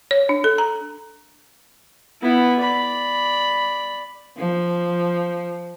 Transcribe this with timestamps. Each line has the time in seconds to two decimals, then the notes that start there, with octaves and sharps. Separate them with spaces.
0.11 C#5
0.29 D4
0.44 A4
0.58 A#5
2.22 B3 E4
2.60 D5 B5
4.38 F3